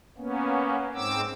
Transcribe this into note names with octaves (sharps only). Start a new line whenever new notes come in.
A#3 B3 C#4
G#2 C4 D6 E6